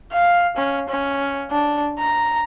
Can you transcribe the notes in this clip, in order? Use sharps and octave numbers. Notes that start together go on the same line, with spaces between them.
F5
C#4
C#4
D4
A#5